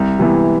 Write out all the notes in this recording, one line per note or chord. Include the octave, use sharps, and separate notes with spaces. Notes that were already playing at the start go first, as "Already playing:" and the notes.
Already playing: C2
C3 E3 B3 E4